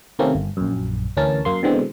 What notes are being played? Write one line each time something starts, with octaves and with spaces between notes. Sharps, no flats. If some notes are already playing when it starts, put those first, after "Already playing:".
C3 D#3 A3 A#3 C4 C#4
G1
A#1 F#2
D2 E3 C#4 A#4 A5
F#2 A#3 C6
B2 D3 E3 G#3 C4